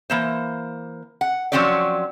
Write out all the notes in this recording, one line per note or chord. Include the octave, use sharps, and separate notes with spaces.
E3 A#3 C5
F#5
F3 F#3 C4 C#4 C#5 D5